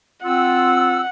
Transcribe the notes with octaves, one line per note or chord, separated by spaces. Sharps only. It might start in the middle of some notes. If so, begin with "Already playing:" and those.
C4 F4 F#5 E6